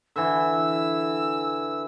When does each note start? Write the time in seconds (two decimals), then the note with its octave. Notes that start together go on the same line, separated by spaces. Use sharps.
0.16 D3 E3 E6